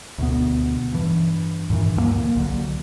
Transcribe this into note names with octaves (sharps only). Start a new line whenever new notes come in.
D2 B2 B3
G2 E3
G2 A#2 D#3 E3
D2 F3 A#3
C2 D3 F#3